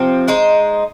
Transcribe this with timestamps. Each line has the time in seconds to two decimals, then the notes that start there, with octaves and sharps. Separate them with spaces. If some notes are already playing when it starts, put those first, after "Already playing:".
Already playing: C3 F3 C4
0.28 G#3 D#4 C5